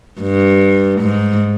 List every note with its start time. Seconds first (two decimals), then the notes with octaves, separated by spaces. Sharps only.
0.21 G2
1.01 G#2